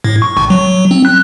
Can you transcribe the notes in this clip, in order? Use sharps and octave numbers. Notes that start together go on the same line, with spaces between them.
A2
C#6
G#1
F#3
C4
F#6